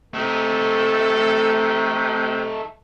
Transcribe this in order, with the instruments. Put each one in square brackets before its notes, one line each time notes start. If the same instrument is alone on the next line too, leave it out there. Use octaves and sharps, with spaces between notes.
[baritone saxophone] C3 [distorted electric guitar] A3 D#4 [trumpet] A4